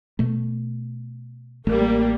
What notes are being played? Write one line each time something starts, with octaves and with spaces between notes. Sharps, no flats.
B2 A3
A1 G3 A3 A#3